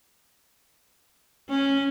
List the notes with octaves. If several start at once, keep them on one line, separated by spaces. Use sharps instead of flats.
C#4